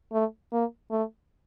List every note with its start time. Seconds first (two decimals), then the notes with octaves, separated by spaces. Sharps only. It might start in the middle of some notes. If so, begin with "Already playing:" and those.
0.13 A3
0.52 A#3
0.91 A3